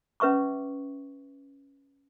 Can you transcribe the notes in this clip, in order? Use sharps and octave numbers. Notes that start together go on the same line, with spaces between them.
C#4 B4 E5 C#6 D6